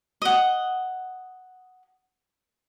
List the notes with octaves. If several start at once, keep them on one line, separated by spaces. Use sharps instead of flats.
D#5 F#5